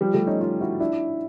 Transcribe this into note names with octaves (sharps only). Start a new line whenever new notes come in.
F3 G3
G3 A3
C#4 D#4
D#4 F4
E4 F#4
D4 E4